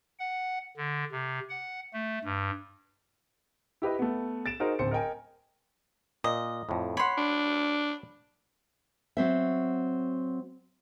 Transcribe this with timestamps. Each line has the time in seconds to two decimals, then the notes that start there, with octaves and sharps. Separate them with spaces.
0.19 F#5
0.77 D3
1.12 C3
1.49 F#5
1.93 A3
2.25 G2
3.82 E4 G4 B4 D#5
3.99 A3 B3
4.46 A6 D7 E7
4.60 D#4 F#4 G#4 A#4 C5 D#5
4.79 D1 C4 C5 C#7
4.91 A#4 D#5 G5 G#5
6.24 A#2 D#5
6.69 F2 A2
6.97 C#5 F#5 B5 C6
7.17 D4
9.17 F#3 C4 E5